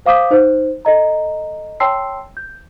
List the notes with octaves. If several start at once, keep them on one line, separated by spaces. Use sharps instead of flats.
C5 F5 D6 D#6 G6 B6
D#4 C5
A4 D#5 A#5
C#5 G5 A5 C6 E6 C7
G6